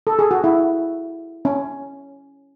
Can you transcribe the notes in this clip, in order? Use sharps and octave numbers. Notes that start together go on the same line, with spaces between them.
A4
G#4
F#4
E4
C#4